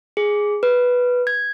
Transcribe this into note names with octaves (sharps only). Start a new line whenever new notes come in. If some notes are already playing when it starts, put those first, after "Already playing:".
G#4
B4
G#6